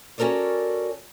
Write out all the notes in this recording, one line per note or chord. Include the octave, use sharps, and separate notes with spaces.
C#4 F#4 A4 A#4 C#5 D5